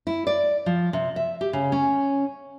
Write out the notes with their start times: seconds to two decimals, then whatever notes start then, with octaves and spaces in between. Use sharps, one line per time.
0.07 E4
0.27 D5
0.66 F3
0.93 C3
1.16 E5
1.41 G4
1.53 C#3
1.72 C#4